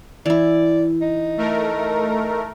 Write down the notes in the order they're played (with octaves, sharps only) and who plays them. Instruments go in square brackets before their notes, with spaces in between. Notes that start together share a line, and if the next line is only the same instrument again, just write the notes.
[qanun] E3 E4 [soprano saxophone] D5
[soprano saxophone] D#4
[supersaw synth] A3 A#4